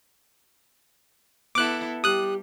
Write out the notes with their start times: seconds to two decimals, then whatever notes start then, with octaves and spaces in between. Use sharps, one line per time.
1.55 B3 E4 A4 D6 F#6
2.04 G3 G4 D#6 F#6